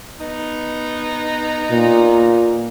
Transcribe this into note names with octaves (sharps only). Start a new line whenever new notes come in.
B3 D#4
A#2